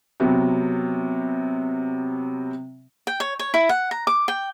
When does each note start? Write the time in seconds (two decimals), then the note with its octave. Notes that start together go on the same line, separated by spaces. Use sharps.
0.20 C3 F#3 B3 C4
3.07 G5
3.20 C#5
3.39 C#5
3.54 E4
3.69 F#5
3.91 A#5
4.07 D6
4.28 G5